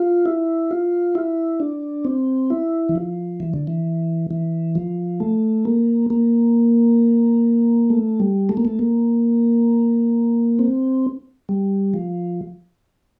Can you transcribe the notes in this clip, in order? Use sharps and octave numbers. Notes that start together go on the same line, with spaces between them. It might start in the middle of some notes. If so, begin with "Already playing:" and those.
Already playing: F4
E4
F4
E4
D4
C4
E4
E3
F3
E3
D3
E3
E3
F3
A3
A#3
A#3
A3
G3
A3
A#3
A3
A#3
C4
G3
F3